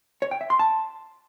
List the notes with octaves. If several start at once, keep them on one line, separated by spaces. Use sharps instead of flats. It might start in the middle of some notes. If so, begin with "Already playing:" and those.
C#5
G5
E5
C6
A5